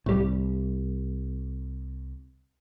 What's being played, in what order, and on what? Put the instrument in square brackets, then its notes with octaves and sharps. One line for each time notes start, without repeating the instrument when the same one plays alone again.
[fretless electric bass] C2 [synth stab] A2 G3